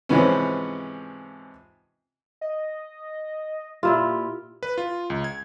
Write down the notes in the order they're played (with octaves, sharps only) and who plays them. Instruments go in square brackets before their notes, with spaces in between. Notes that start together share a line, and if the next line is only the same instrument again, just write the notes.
[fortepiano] G#2 C3 E3 F3 B3 C#4
[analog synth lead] D#5
[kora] A#2 E4 F4 [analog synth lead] G4
[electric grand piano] B4
F4
C#2
G#6